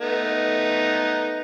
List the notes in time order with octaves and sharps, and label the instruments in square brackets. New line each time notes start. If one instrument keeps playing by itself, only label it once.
[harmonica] A3 B3 D#4